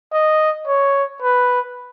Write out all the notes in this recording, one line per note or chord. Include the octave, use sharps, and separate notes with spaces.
D#5
C#5
B4